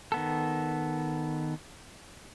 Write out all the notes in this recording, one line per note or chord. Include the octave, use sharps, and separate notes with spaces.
D#3 B3 A4